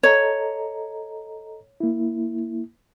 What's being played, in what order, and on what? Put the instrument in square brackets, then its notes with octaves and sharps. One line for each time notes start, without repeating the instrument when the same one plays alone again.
[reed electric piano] A4 D#5 A#5 [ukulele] C#5
[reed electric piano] A#3 E4